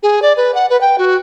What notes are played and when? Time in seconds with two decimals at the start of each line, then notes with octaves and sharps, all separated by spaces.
0.03 G#4
0.22 D5
0.37 B4
0.55 F#5
0.70 B4
0.81 G5
0.98 F#4